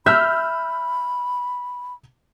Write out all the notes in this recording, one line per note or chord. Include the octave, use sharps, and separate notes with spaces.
E5 B5 E6 F6 G6